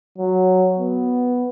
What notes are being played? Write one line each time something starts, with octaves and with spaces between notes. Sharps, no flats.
F#3
B3